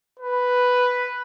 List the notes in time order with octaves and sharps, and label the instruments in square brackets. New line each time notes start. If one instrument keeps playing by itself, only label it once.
[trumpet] B4